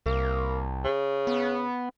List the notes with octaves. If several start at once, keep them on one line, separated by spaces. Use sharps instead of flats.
C2 A#3
C#3
B3